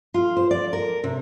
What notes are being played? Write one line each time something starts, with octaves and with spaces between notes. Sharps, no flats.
F4
C5
D5
A#4
C3